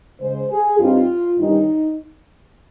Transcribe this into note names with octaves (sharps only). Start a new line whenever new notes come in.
C#3 G#3 C#4 C5
G#4
G2 G3 C4 D#4 F4
G2 D#3 G3 C#4 D#4